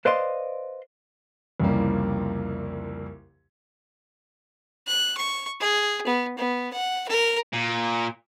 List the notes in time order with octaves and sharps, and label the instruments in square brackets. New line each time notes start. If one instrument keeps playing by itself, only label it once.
[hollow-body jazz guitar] B4 C5 D5 D#5 F5 C6
[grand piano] C2 F2 C#3 E3 G3 A#3
[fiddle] F#6
C#6
G#4
B3
B3
F#5
A#4
[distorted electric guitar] A#2